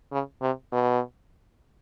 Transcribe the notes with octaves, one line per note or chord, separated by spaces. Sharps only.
C#3
C3
B2